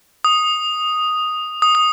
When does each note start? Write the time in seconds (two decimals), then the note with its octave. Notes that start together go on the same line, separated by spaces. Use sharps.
0.24 D#6
1.62 D#6
1.75 D#6